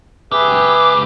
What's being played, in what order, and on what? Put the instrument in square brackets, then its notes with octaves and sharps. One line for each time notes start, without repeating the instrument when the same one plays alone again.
[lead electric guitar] C#2 G4 [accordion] G#4 B4 E5